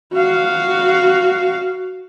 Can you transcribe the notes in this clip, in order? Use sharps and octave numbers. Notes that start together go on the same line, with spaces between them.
F#4 F5